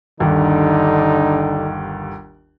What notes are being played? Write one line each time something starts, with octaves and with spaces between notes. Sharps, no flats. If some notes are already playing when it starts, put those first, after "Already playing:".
G1 D#2 D3 D#4